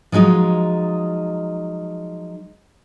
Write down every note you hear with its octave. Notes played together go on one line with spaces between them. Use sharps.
F3 F#3 G#3 D#4 F4